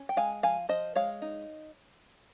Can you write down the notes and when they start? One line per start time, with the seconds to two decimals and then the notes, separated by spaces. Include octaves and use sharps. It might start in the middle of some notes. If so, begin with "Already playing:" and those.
Already playing: C#4
0.09 G5
0.17 G#3 F5 G#5
0.43 F3 F5 G#5
0.69 F3 C5 D#5
0.95 G#3 C#5 F5
1.22 D#4